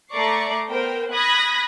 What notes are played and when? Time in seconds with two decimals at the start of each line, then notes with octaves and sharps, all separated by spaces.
0.11 A3 D5 A#5 C#6 D6 C7
0.70 B3 A#4 C5 G5
1.13 B5 D#6 F#6 G#6 A#6 B6